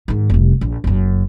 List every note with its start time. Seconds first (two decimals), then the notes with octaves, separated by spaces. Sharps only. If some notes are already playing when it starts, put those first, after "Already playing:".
0.08 G#2 D#3
0.30 F1 C2
0.61 A#1
0.84 F#1 F#2